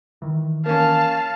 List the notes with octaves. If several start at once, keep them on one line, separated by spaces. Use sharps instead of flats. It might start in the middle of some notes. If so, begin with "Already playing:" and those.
D#3 E3
A#3 C#4 F5 A5